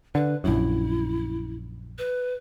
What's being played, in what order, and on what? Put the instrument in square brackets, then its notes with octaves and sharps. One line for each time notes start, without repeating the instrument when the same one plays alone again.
[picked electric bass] D3 [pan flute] B4
[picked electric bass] A#1 F#2 [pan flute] E4
[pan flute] B4